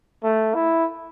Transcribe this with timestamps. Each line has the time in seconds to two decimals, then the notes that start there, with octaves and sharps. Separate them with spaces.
0.23 A3
0.54 E4